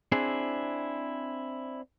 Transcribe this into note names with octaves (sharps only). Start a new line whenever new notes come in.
C4 D4 E4 G#4